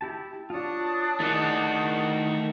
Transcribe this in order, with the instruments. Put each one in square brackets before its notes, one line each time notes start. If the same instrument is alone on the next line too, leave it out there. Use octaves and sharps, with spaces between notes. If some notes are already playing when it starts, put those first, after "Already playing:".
[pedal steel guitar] E4 G4 A5
[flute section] D4 A5 D#6 [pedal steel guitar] F4 C#5
[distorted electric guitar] D#3 [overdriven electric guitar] A3 F#4 [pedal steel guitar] E4 G#4